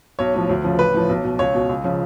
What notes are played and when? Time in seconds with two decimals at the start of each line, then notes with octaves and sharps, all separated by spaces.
0.19 B1 C#5
0.34 A2 F3
0.49 D2
0.64 C#3 F3
0.79 A1 B4
0.94 A2 F3
1.09 B1
1.25 B2
1.39 C#2 C#5
1.55 B2
1.69 C#2
1.84 C#3 F3